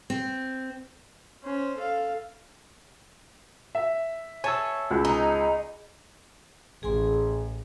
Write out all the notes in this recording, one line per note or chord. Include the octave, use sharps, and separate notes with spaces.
C4
C#4 C5
A4 F5
E5
C#5 G#5 A5 E6
C#2
D#4
A1 G#4 G#5 C6